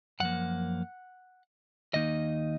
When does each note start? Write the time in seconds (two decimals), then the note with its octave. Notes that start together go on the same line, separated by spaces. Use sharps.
0.20 F#2 F3 A#3 F#5
1.94 D#2 D#3 A#3 D#4 D#5